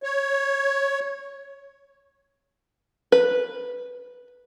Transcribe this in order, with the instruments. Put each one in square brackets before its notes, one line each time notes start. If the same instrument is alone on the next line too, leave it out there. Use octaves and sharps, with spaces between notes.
[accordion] C#5
[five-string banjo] B4